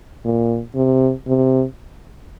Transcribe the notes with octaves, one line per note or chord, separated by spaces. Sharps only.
A#2
C3
C3